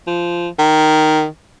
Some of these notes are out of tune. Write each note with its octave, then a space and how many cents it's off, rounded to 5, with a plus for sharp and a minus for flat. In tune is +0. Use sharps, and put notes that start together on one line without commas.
F3 -10
D#3 -5